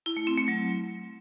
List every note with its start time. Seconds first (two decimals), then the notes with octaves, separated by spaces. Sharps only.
0.06 E4
0.17 A3
0.27 C4
0.37 A3
0.48 F#3